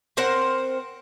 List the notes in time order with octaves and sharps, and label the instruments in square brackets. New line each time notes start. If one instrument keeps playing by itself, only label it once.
[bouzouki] C4 A#4 C5 F#5